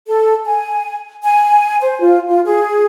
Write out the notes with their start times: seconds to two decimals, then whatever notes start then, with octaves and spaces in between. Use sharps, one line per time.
0.08 A4
0.45 G#5
1.23 G#5
1.81 C5
2.01 F4
2.28 F4
2.45 G#4